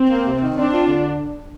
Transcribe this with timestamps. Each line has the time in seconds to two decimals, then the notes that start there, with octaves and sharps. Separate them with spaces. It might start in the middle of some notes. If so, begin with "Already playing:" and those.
Already playing: C4
0.09 A#3
0.26 C3
0.41 D#3
0.57 C4 D4
0.73 F4
0.88 D3